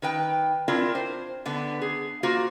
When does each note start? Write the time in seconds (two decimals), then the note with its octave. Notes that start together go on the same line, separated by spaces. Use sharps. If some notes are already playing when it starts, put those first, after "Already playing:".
0.02 D#3 B4 G5
0.68 C4 D4 E4 F4 A#4
0.95 C5
1.46 D3 B3
1.81 G#4
2.23 A#3 F4 F#4 C5